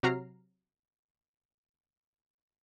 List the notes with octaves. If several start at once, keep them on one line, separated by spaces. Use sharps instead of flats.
C3 F#3 F#4 A#5 F6 C7